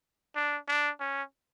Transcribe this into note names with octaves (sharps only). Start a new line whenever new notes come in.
D4
D4
C#4